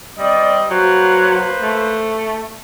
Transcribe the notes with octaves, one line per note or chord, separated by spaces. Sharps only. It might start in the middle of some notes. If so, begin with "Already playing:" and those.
G3 C4 D5 D#5
F#3 A#3 B4 C5
A3